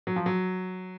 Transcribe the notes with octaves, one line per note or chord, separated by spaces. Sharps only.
F#3
F3
F#3